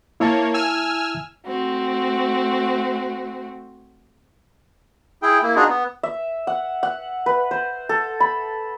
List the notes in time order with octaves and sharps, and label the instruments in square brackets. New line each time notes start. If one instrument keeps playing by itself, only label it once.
[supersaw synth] A#3 C#5 [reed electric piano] E4 E5 A5
[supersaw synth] G#5 E6 F6
[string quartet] A3 C4 F#4
[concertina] E4 G#4 G5
A#3 E4
D4 D#4 F4 F#4 G#4
B3
[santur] E5
F#5
F#5
B4
C5
A4
B5